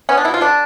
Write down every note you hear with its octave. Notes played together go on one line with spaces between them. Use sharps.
B3 C#4
D4
B2 E4
F4
D3 D4